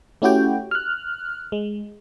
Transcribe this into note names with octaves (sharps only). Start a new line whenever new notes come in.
A3 C#4 E4 F#4 G4 G5
F6 F#6
G#3